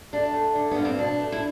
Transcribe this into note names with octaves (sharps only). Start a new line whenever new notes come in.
A3 D4
A3
D3
B3
G2
C4
B2 D4
A3
E4